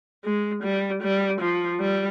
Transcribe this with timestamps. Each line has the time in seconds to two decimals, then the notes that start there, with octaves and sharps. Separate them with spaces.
0.24 G#3
0.63 G3
1.02 G3
1.41 F3
1.80 G3